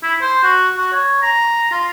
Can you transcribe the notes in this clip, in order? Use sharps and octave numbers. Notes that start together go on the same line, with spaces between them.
E4
C5
F#4
F#4
C#5
A#5
F4